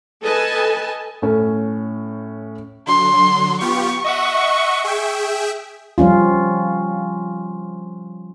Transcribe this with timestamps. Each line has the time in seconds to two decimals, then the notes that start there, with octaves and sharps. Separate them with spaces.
0.22 A4 B4 D#5 G#5 A5
1.22 A2 C#4 A4
2.87 D3 F#3 C6
3.60 B3 F4 G4 C#6
4.04 D#5 E5 F#5
4.84 G#4 E5 G5
5.98 F3 G3 C#4 F4